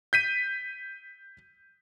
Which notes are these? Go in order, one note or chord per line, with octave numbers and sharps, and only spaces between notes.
G6 B6 D#7